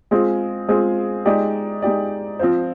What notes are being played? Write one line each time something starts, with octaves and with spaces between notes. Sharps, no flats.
G#3 C4 F4 G#4
G#3 C4 F4 G#4
G#3 D#4 G4 D5
G#3 D#4 G4 D5
F3 C4 F4 C5